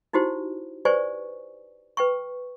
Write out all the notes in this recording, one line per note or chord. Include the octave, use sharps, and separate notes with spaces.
D#4 E4 F#4 G4 C5
G4 B4 C5 D5 G#5 C#6
B4 G5 C#6